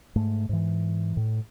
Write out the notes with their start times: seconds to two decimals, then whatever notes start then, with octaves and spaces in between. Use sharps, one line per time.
0.16 G#2 A3
0.49 G#2 E3
1.17 A2